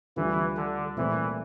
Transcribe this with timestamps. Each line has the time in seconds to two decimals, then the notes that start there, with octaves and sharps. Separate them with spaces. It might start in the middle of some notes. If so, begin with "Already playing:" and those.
0.16 D2 D3 E3 G3 D4 F4
0.57 D3
0.97 C2 A#2 E3 A3 C4 E4